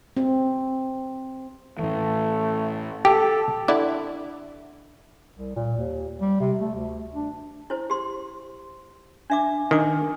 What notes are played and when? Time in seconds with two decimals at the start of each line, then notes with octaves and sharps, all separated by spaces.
0.17 C4
1.79 A2 E3 A3
3.05 G4 A4
3.68 D3 E4 D5
5.37 C2
5.56 A#2
5.77 D#2
6.21 G3
6.40 C3
6.61 A3
6.75 D2
7.14 D4
7.70 E4 C5
7.90 G4 C6
9.30 D4 E5 D6
9.71 D#3 D4 D6